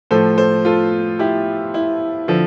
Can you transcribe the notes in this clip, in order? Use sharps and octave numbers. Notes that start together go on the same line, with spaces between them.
A2 F3 A4 C5
A4 C5
F4 A4
E4 G4
E4
D3 F3